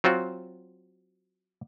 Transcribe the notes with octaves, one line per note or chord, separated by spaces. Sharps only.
F#3 C4 F4 F#4